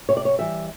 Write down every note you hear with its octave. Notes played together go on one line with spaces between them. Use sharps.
C3 C#5
D5
C#5
E3 G3 E5